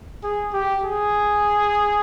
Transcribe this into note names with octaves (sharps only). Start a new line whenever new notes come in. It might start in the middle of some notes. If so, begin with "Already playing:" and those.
G#4
G4
G#4